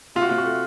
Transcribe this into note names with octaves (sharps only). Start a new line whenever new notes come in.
C3 F4
F#4
C3 F4
F#4
A3